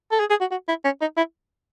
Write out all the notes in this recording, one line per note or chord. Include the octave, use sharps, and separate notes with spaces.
A4
G#4
G#4
F#4
F#4
E4
C#4
D#4
E4